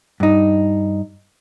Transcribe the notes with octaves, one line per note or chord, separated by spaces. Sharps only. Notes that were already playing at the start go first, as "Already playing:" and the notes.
G2 D#4